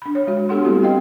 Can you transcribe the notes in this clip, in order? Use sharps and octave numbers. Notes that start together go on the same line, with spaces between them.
D4 B5
C#5
G#3 F#4
B3 D4 G4 A4 F#5 C6
G3 A3 C4 E4 F#4 G4
B4 D#5 F5 G5